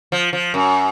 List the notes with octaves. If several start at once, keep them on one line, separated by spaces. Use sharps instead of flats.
F3
F3
F#2